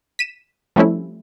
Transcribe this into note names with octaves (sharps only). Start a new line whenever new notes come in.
B6 D#7 E7
F3 G3 A3 C4 C#4 E4